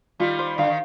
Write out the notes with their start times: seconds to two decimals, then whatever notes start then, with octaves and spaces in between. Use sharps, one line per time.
0.20 D#3 G3 F4
0.39 C5
0.58 D3 F5
0.68 D#3